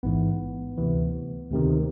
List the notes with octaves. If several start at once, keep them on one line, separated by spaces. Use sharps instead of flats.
A1 G#2 E3 B3
D2 C3 E3
D2 C3 D#3